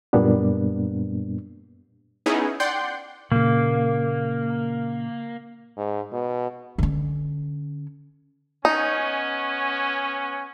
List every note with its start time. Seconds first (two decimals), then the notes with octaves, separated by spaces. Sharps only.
0.13 F#2 A#2 G3 A#3 B3 D4
2.26 B3 C#4 D#4 E4 G#4
2.60 D5 F#5 G5 C6 G6
3.32 A#2 C#3 A#3
5.78 G#2
6.12 B2
6.78 D3 C#4
8.65 B3 C#4 D#4